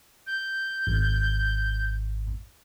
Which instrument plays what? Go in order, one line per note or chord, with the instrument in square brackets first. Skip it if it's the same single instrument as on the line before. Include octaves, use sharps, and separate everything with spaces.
[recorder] G6
[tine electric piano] G#1